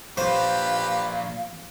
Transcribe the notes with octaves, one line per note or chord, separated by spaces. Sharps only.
A#2 F3 G4 B4 C5 F5